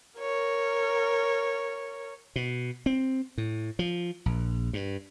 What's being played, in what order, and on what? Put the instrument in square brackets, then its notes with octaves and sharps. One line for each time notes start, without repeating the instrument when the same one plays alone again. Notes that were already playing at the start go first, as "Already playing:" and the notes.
[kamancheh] A#4 C#5
[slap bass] B2
C4
A2
F3
A#1
G2